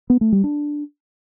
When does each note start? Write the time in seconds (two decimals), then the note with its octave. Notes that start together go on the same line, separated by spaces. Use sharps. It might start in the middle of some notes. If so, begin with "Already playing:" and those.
0.10 B3
0.21 A3
0.32 G3
0.44 D4